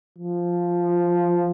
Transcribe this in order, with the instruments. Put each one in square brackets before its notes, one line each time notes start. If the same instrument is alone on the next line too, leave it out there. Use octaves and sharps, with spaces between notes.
[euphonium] F3